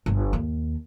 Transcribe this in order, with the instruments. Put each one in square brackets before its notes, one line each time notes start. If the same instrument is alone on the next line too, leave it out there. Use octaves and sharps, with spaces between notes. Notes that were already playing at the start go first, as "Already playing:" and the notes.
[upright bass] G1
D#2